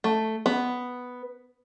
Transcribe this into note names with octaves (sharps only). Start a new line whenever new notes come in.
A3
B3